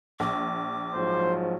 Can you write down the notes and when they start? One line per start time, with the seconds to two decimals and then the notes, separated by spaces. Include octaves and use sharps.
0.20 A#1 D6
0.94 G#2 F3 F#3 C5